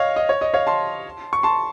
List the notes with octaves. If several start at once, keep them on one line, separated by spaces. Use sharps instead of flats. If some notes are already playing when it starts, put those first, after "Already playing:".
Already playing: C#5 D#5 F5
D#5
C#5
D#5
C#5 F5
A5 C6
C#6
A5 C6